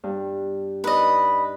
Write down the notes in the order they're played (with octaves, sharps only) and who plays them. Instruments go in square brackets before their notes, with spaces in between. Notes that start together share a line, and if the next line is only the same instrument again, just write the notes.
[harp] G2
[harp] D#4 D5 [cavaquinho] B4 D#5